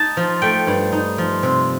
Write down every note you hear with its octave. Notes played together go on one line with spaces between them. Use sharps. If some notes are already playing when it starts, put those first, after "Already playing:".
Already playing: D#4 A5
F3
A3 G5
G2
D#4
F3
C3